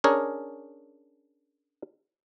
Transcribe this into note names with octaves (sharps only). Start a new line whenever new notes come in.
C#4 D4 G#4 A#4 C#5